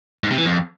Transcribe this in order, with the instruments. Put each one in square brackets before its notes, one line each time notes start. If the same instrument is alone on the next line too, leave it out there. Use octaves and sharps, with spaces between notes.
[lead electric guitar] G#2
C3
E3
F2